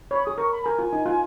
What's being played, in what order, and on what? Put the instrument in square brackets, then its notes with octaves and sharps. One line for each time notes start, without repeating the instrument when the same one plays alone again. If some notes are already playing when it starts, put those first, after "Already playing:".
[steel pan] C#5 [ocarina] B5
[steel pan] G#4 [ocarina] D#6
[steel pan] A#4 [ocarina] C#6
[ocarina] B5
[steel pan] A#4 [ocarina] G#5
[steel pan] F4
D#4
F4